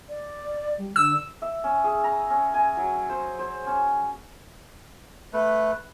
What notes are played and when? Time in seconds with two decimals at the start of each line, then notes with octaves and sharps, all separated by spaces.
0.09 D5
0.78 G3
0.96 D3 E6
1.42 E5
1.64 C#4
1.84 G#4
2.04 A#5
2.30 C#4
2.54 G#5
2.77 F#3
3.09 C5
3.39 C5
3.66 C#4
5.33 A3 B4